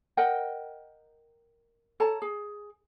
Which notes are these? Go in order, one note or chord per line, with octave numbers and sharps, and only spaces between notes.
A#4 D#5 F#5 G5
A4 C#5 A5 A#5
G#4